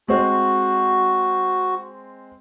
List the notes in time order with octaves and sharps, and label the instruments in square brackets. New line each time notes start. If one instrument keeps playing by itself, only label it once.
[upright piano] G#3 C4 [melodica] F#4